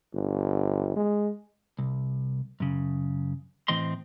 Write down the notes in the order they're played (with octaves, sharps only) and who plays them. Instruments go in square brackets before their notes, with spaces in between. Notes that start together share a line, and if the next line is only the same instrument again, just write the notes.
[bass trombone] G1
G#3
[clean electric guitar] C2
F#2 C#3
A2 E3 C4 D#5 C6